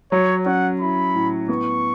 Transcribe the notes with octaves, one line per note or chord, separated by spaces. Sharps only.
F#3 C#5
C#4 F#5
E4 B5
A2
B3 C#6